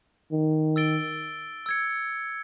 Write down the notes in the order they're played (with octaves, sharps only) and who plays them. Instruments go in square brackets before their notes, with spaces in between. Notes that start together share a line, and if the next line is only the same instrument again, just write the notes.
[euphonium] D#3
[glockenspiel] E6 A6 D7 G7
E6 G#6 C#7